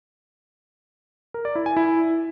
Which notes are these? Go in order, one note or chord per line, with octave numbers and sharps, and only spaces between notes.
A#4
D5
E4
G#5
E4